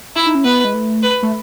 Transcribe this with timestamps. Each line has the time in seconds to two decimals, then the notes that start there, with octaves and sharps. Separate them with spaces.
0.16 E4
0.26 D#4
0.35 C#4
0.44 B3 B4
0.65 G#3
0.74 A3
1.03 B4
1.23 A3